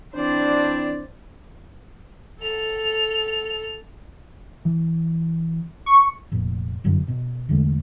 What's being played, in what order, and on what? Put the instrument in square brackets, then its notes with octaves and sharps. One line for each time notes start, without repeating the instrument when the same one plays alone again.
[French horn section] E3 C4 D4 [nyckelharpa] C5 D5
[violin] A4 F7
[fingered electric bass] E3
[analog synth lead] C#6
[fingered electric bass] F1 A#2
G1 F#2 D3
B2
E2 D3 G#3 A3